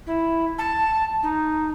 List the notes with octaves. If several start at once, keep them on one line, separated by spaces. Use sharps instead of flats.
E4
A5
D#4